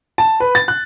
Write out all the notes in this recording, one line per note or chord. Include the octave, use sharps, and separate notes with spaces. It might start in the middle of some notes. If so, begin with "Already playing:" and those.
A5
B4
A6
F#6